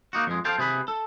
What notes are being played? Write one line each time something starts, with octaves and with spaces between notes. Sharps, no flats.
A#3 D#4 F#4
F2 G#3
A4 C5 F5 G5 A5
C3 G#4 B4 B5
A4